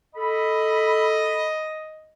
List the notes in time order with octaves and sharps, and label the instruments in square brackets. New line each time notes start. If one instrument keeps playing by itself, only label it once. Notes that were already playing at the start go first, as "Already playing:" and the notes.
[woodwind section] A4 B5 [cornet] D#5